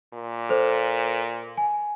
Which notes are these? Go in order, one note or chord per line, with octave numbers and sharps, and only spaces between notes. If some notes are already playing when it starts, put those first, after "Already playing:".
A#2
A4 C5
G#5